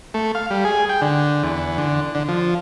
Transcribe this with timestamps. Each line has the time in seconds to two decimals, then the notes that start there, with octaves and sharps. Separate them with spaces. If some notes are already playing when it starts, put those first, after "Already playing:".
0.14 A3
0.35 F5
0.51 G3
0.65 G#4
0.89 G5
1.02 D3
1.43 E2
1.78 D3
2.15 D3
2.28 F3